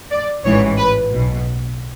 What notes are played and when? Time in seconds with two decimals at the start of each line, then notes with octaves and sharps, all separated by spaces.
0.10 D5
0.44 A1 G#2 E3 C#5
0.77 B4
1.11 B1 B2